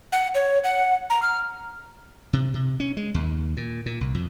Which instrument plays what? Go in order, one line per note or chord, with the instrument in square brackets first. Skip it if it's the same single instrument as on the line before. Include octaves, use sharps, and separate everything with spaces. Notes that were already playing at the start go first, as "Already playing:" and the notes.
[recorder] F#5
C#5
F#5
A#5
F6
[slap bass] C3
C3
C#4
G#3
D#2
A#2
A#2
C2
F2